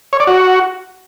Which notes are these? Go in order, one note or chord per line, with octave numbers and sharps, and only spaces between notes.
C#5
D5
F#4